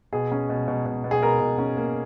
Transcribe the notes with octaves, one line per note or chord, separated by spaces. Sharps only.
B2 G#4
C#4
B2
B2
B2
B2
G#4
B2 A#4
B2
C#4
A#3